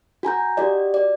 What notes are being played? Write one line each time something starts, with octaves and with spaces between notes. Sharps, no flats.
F#4 G#5 A#5 G6
F#4 G4 D5 D#5
D5